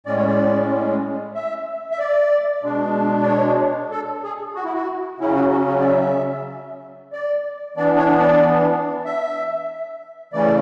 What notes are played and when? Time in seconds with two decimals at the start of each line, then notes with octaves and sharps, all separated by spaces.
0.06 A2 G#3 C#4 D5
0.16 C#5
0.26 D5
1.35 E5
1.91 E5
1.99 D5
2.63 B2 G#3 D4
3.22 D5
3.27 C#5
3.91 A4
4.24 G#4
4.55 F#4
4.64 E4
4.74 F#4
5.20 C#3 F#3 C#4 E4
5.35 F#4
5.52 F#4
5.68 F#4
5.80 D5
5.84 E5
7.13 D5
7.77 E3 B3 D4 D5
7.97 C#5
8.19 D5
9.05 E5
10.33 C#3 E3 A3 C#4 D5